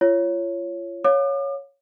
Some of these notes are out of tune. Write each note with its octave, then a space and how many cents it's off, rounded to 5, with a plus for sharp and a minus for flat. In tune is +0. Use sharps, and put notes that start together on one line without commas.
F4 -30 C#5 +0
C#5 +0 F5 +30 D6 +40